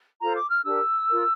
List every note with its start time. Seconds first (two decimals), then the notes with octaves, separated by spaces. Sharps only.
0.20 F4 A4 C5 A#5
0.35 D6
0.50 F6
0.64 D4 G4 A#4 E6
1.08 F4 A#4